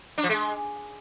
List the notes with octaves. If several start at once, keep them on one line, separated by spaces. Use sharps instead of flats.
D4
F3
G#3